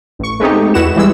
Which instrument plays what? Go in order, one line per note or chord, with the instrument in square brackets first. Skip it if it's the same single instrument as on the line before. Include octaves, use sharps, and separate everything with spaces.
[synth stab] A1 C#6
G#3 A3 B3 C4 D#4 G4
E2 E4 F#4 B4 F#5 E7
E3 G3 G#3 E6